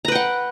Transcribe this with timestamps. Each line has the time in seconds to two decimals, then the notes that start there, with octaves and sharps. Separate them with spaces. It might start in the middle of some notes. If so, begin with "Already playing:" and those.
0.05 A#5
0.08 B4
0.12 G5
0.15 F#5